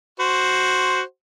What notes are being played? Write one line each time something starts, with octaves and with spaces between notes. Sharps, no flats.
F#4 C5